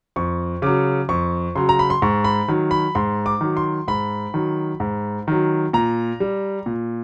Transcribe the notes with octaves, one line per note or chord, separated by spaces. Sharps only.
F2 C#6
C#3 F#3 D6
F2 C#6
C#3 F#3 C6
A#5
B5
C6
G#2 C#6
B5
D#3 F#3
B5
G#2 C6
D6
D#3 F#3
C6
G#2 B5
D#3 F#3
G#2
D#3 F#3
A#2 A#5
G3
A#2